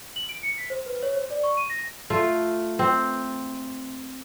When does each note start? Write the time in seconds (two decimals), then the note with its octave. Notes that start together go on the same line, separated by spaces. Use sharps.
0.16 F#7
0.29 D7
0.43 C#7
0.58 B6
0.70 C5
0.86 B4
1.03 C#5
1.15 C5
1.30 D5
1.43 C#6
1.57 D#7
1.70 A#6
2.10 A3 F4
2.79 C4